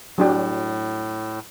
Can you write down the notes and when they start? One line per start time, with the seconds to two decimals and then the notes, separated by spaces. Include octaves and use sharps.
0.18 A2 F#3 D4 G4